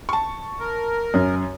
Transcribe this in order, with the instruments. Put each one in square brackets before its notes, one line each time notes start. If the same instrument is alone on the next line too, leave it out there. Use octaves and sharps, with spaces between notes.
[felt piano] A5 C#6
[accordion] A#4
[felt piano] F#2 C#4